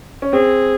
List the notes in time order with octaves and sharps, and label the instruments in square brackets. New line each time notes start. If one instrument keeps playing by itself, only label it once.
[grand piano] C#4
[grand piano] C4 [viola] G#4